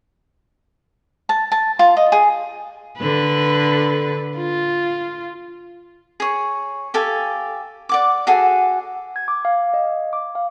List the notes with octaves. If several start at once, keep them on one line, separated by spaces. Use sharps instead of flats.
A5
A5
F4
D#5
G#4
D3 B4
F4
G#4 C#5
G4 A4 F5 G#5
D5 F#5 D6
F#4 G#4 A4 F#5
G#6
D6
F5
D#5
D6
F5